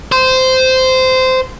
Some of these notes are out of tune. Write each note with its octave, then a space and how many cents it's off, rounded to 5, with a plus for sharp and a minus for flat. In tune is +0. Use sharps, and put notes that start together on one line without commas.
C5 -15